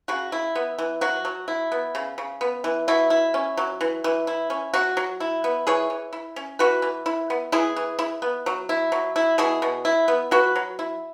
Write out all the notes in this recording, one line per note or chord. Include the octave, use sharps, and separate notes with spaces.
C#3 F#4
E4
B3
E3
F#3 F#4
F#3
E4
B3
C#3
C#3
B3
E3
B2 E4
E4
C#4
F#3
E3
E3
E4
C#4
F#3 F#4
F#3
E4
B3
E3 G#4 C#5
E3
E4
C#4
E3 F#4 B4
E3
E4
B3
E3 E4 G#4
E3
E4
B3
F#3
E4
F#3
E4
B2 E4 G#4
B2
E4
B3
F#3 F#4 B4
F#3
E4